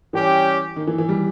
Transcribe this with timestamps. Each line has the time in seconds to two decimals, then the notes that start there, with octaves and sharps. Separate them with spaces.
0.13 E3 G3 C#4 G4
0.76 D#3
0.87 E3
0.98 E3
1.09 G3